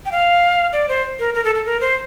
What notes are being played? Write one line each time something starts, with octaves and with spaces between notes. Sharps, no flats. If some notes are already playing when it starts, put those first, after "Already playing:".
G5
F5
D5
C5
A#4
A#4
A4
A4
A#4
C5